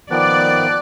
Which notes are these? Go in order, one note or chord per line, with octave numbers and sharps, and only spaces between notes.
D#3 F3 B3 D5 F#6